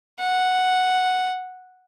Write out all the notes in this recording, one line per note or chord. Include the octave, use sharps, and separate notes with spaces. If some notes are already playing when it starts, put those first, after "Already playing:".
F#5